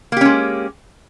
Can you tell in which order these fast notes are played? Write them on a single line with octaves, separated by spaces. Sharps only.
A#3 G4 C#4 G#3